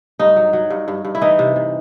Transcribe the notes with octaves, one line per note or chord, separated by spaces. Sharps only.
G2 D#4
F#3
F#3
G2
G2
G2
E4
E3 D#4
C3
C3